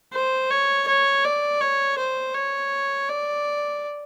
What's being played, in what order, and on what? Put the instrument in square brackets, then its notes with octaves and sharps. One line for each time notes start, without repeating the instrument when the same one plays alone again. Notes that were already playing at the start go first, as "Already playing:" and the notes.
[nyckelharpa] C5
C#5
C#5
D5
C#5
C5
C#5
D5